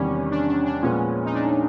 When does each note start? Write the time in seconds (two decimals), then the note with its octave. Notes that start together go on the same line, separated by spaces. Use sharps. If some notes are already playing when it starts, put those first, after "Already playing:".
Already playing: E2 C3 D#3 G3 C#4
0.31 D4
0.48 D4
0.66 D4
0.82 A#2 F3 G#3 B3 C#4
1.25 D#4
1.34 D4